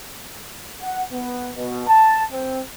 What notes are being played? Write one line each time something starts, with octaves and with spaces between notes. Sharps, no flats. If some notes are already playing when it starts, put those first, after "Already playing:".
F#5
B3
B2
A5
C4